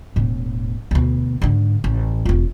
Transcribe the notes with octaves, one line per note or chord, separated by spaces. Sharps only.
E1 A2
D2 B2
G#2 D3
A1
E1 F4